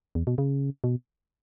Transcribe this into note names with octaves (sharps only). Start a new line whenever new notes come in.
E2
B2
C#3
B2